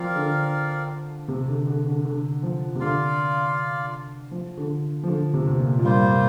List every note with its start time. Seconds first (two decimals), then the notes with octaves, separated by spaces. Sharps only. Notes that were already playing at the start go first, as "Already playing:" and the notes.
Already playing: F3 C4 A#4 D5 F5
0.16 D3
1.28 C3
1.48 D3
1.67 D3
1.86 D3
2.05 D3
2.43 F3
2.75 C3
2.80 D3 F4 D5 F5
4.31 F3
4.57 D3
5.03 F3
5.08 D3
5.33 C3
5.47 C3
5.58 A#2
5.79 A#2
5.83 G2 G3 A#3 F4 C5
6.04 C3
6.09 A#2